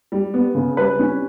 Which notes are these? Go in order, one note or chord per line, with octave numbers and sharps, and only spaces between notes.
G3
B3
C#3
G3 B4
C#4